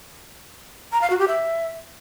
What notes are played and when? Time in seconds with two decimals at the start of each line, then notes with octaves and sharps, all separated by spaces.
0.92 A#5
1.01 F5
1.10 F#4
1.19 G4
1.28 E5